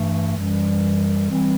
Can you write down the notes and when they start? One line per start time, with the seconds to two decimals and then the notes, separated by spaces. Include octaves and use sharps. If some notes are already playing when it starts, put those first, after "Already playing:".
Already playing: G2 E3 A3
0.37 F#2 E3 G3
1.29 E3 G3 C4